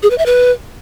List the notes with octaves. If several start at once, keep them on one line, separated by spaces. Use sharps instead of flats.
G#4
B4
E5
B4